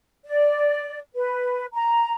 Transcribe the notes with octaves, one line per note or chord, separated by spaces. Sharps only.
D5
B4
A#5